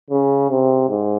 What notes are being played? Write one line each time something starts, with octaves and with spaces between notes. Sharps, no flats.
C#3
C3
G#2